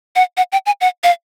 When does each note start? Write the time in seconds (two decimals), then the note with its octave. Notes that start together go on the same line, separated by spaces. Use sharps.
0.16 F#5
0.37 F#5
0.52 G5
0.66 G#5
0.81 F#5
1.04 F5